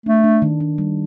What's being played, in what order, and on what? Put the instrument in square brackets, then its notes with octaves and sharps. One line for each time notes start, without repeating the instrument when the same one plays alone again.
[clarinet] A3 [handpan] D4
[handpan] D4
D#3
D4
G3